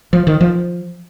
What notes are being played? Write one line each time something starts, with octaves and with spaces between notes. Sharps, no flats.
F3
D#3
F3